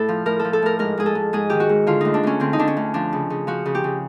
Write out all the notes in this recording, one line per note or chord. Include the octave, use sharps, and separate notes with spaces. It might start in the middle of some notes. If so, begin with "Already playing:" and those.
Already playing: A2 A4
F3
A2 A#4
F3 A4
A4
A2 A#4
G#2 A#4
G#2 G#4
A4
G#2
G#2 G#4
D#3 G4
F#4
G#2
D3 F4
D2 D#4
D4
D2 C#4
D3 C4
D#4
D3 D4
C#4
D2
F3 D4
C#3
C#3
F3 F#4
C#3
G4
C#3